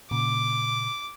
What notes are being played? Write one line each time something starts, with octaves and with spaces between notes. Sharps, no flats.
A#2 C#3 D6